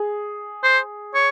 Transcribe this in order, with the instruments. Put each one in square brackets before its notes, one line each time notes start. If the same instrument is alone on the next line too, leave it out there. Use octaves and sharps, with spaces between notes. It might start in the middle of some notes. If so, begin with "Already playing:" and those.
Already playing: [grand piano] G#4
[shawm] C5
C#5